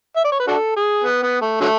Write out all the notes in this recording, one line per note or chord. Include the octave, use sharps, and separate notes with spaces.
E5
D5
C#5
B4
D4 F#4 A4
G#4
B3
B3
A3
D3 F#3 A3